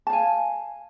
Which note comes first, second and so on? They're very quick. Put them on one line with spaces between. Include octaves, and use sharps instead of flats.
A5 F5 G#5